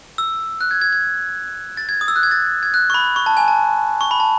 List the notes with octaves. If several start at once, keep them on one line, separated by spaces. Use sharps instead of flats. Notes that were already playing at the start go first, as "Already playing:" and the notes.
E6
F#6
G#6
G#6
G#6
A6
G#6
D#6
E6
F#6
G#6
A6
G#6
F#6
C#6
B5
C#6
A5
G#5
A5
C#6
B5
A5